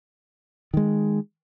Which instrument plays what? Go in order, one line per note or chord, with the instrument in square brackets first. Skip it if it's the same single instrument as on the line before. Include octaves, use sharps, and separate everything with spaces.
[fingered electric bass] D#3 G#3